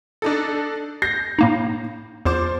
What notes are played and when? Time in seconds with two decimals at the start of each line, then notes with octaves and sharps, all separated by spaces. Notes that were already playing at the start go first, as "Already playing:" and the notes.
0.22 D4 D#4 A4
1.02 G6 A#6 C7
1.39 A2 A#3 D#4
2.25 E2 F3 C5 D6